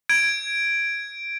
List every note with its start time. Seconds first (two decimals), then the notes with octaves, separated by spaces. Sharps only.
0.09 G#6 D7